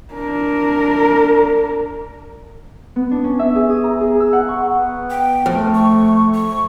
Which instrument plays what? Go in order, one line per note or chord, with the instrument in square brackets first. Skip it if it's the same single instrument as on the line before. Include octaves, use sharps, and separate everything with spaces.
[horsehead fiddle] D4 A#4
[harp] B3
D4
C#4
E5
G#4
D#6
A#5
G#4
E6
F#5
C#6
[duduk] B3
[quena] G5
[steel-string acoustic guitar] F2 [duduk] A3
[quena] C#6
C#6